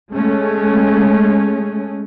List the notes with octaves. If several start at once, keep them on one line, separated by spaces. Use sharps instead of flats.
G#3 A3 C#4